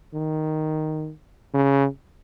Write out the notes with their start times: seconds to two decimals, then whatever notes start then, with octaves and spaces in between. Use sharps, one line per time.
0.14 D#3
1.54 C#3